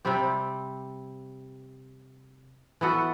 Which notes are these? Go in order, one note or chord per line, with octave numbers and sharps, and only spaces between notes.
C3 G3 C4 G4
E3 B3 F#4 A4